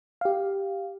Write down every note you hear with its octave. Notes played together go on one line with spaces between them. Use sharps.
G4 F5